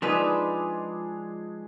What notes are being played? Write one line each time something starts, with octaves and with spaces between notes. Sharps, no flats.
F3 G#3 D4 D#4 G#4 B4